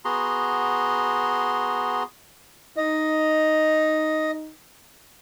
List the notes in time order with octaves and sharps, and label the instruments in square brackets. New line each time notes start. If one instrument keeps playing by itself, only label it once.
[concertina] B3 F#4 G#4 A#5 C6
[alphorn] D#4 [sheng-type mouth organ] D#5